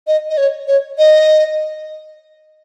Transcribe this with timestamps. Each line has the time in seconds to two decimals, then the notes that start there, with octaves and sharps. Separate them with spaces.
0.07 D#5
0.30 D#5
0.37 C#5
0.68 C#5
0.98 D#5